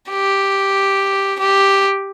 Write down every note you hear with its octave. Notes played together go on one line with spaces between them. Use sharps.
G4
G4